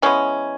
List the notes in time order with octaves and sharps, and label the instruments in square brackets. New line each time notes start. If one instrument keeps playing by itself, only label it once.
[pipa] E3 G#3 B3 C#4